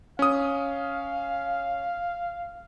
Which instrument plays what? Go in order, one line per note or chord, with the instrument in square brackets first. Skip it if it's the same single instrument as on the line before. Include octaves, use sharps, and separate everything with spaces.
[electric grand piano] C#4 D#6 [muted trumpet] F5